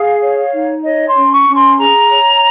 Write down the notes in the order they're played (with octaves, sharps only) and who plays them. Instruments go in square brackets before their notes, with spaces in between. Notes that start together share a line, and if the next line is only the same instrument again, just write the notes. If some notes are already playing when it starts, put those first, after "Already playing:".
Already playing: [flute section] G#4 F5
C#5
D#4
C#5 D#5
C6
C#4
C#6
C#4
C6
G#4 A#5
C#5